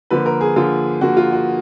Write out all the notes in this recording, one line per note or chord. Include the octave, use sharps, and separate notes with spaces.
D3 F3 A#3 B4
A#4
G#4
D3 F3 A#3 F4
D3 F3 A#3 F#4
F4
F#4